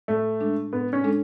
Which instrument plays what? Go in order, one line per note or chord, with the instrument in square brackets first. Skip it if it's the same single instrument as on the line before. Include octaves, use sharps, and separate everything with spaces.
[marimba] A2 [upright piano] A3
[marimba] G#3 D4 A4
[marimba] A2 [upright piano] B3
[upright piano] C#4
[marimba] G#3 D4 A4